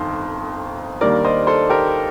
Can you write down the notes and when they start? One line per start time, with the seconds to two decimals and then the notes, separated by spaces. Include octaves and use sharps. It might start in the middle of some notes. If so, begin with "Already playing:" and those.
Already playing: G1 F2 D#3 C5
1.01 D#2 D#3 G3 A#3 D4 A#4 D5
1.24 C5 D#5
1.47 A4 C5
1.70 G4 A#4